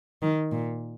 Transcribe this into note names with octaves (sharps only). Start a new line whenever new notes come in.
D#3
A#2